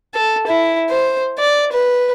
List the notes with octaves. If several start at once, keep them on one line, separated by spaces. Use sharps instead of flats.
A4
E4
C5
D5
B4